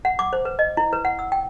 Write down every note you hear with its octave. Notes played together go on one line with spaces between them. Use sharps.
F#5
D6
C5
B4
D#5
E4
B4
F#5
E6
G5